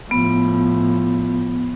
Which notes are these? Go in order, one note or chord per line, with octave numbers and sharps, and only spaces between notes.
A2 F3 B3